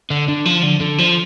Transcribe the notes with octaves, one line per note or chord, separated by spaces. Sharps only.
D3
D3
F3
D3
D3
F3